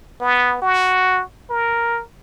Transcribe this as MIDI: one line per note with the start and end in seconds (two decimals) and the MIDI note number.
0.21 0.58 59
0.62 1.22 66
1.50 2.02 70